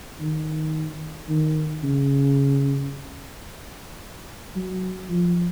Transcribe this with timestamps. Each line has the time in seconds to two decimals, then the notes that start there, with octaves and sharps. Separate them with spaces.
0.21 D#3
1.29 D#3
1.84 C#3
4.56 F#3
5.10 F3